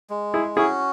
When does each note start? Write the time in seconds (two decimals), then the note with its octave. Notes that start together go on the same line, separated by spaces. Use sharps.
0.10 G#3
0.34 E4 G#4
0.56 C#4 E4 F#4 G#4